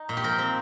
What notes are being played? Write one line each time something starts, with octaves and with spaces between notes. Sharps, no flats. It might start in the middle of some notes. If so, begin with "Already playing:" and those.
Already playing: D#4
A#2
G4
F3 A#4
C4